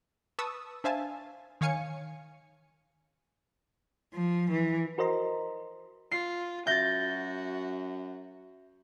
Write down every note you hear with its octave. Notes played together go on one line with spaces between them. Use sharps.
B4 A5 C#6 D#6 E6
D4 C5 E5 F5 G#5 A5
D#3 C#5 F5 G#5 C#7
F3
E3
F#4 A#4 C5 D#5 A#5 C6
F4 C7
F#2 F#4 E5 G6 A6 A#6 G7